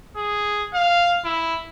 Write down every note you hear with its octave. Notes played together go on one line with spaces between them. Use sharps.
G#4
F5
E4